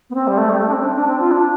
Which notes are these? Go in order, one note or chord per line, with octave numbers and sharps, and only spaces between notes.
B3
C4
G3
A3
G3
A3
D4
C4
D4
D4
C4
F4
D4